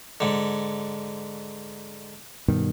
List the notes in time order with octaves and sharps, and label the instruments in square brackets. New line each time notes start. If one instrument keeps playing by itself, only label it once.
[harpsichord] G#2 D3
[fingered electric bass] G2 B2 D#3